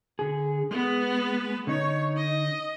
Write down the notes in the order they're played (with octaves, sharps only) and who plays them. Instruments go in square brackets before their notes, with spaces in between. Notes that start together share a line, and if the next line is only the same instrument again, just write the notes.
[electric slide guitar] D3 G#4
[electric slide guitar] G#3 [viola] B3 B4
[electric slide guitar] D3 D#4 [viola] C#5
[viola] D#5